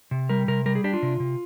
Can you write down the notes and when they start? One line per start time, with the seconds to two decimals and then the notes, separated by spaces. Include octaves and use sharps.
0.11 C3
0.29 G3 A#4
0.48 C3 A#4
0.66 G3 A#4
0.75 G#4
0.84 D4 G4
0.93 F4
1.03 C3
1.20 C3